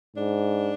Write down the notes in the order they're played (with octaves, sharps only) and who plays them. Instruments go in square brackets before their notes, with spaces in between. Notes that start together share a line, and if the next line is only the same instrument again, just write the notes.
[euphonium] G#2 [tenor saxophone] D4